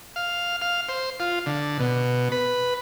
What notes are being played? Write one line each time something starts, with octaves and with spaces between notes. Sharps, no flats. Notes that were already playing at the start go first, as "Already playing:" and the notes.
F5
F5
C5
F4
D3
B2
B4